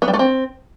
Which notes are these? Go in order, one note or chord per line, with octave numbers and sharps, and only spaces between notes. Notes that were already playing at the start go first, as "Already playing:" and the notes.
B3
G3
A3
C4